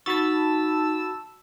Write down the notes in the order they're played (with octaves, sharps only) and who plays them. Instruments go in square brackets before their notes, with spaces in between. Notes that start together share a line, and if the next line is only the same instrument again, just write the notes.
[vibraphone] D#4 [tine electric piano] F#4 C#6 [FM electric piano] A5 B5 A6 [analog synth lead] E6